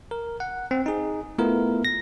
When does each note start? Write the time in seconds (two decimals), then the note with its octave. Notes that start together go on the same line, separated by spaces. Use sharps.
0.11 A#4
0.40 F#5
0.71 C4
0.86 D#4 G#4
1.38 A3 B3 E4 F4 A#4
1.85 A#6